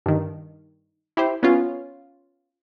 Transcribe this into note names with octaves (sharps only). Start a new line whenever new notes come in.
G2 D#3
E4 G4 C5
B3 C#4 F4